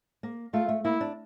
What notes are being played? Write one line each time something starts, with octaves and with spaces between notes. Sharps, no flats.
A#3
A3 F4
A3
A#3 E4
D4